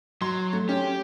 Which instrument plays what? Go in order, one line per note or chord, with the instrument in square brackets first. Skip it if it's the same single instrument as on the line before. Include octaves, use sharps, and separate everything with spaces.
[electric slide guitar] F#3 [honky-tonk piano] C6
[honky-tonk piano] A3
[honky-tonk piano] C#4 [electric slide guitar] G4